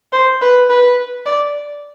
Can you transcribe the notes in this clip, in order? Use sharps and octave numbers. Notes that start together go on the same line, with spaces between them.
C5
B4
B4
D5